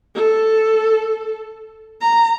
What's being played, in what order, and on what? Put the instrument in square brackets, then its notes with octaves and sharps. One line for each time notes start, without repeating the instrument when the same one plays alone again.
[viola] A4
A#5